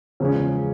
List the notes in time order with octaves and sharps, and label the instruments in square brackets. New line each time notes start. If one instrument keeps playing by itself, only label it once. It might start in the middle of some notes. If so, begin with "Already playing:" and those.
[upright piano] E2 C#3 F3 G#3 C#4